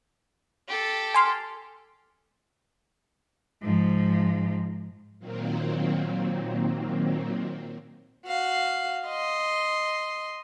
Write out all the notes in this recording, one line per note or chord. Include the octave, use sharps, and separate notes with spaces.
G4 A4
G#5 C6 F6
G#2 F3
A#2 D#3 F#3 A#3 C4
F#4 F5
D#5 C6